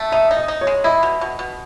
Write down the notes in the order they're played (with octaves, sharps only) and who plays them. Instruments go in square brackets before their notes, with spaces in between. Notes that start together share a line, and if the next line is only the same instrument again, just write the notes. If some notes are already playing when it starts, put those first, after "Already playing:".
Already playing: [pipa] A3
[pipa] D#4 [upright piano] E5
[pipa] D#4
[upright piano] D#5
[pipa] D#4
[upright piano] C#5
[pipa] G#3
[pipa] E4 [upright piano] D#5
[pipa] B2
B2
B2